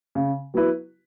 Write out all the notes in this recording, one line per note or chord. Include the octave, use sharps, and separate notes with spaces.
C#3
F#3 B3 E4 B4